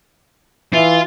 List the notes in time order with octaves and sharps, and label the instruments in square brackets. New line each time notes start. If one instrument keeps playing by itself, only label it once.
[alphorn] E3 [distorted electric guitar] F4 [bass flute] E5